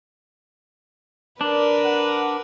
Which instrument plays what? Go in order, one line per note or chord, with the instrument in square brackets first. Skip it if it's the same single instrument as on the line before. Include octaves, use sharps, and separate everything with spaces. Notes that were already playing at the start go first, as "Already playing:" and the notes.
[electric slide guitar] D4 [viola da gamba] A#4 B4 [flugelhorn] D5
[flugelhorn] F#5